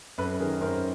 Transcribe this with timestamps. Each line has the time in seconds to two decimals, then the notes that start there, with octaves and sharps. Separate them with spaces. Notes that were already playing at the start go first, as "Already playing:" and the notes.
0.18 F#2 A4 B4
0.39 D#3 G#4 A#4
0.61 F#2 A#4 C5